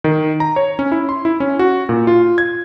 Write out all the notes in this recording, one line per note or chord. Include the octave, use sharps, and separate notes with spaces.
D#3
A#5
C#5
C#4
E4
C6
E4
C#4
F#4
A#2
F4
G#6